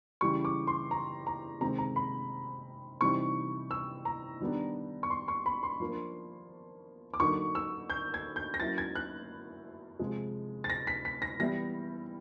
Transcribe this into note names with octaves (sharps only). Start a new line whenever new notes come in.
C#3 E3 G3 C#6
D6
C6
A#5
A#5
C3 D#3 G#3 C4 A#5
A#5
B5
C3 E3 G3 C4 D#4 C#6
E6
A#5
D#3 G3 B3 D4
C#6
C6
C#6
B5
C6
F3 A#3 D4
D6
D3 F#3 A#3 D#4 C#6
E6
G6
G#6
G6
A#6
F#3 A#3 C#4 E4 A6
G#6
F#6
C3 F3 G#3
A6
A#6
B6
B6
A#6
E3 G3 B3 E4 A#6